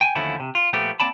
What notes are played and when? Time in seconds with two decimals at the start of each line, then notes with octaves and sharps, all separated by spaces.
0.01 G5 G#5
0.15 D#2 D3 F3 A3 C#4 E4
0.40 C3
0.55 F4
0.73 A#2 F3 A3 B3 G4
1.00 A#3 C4 D5 A5 B5